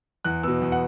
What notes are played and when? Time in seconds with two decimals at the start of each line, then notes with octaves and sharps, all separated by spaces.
0.25 E2 F#6
0.43 B2 B3 E6
0.62 E2
0.72 F#5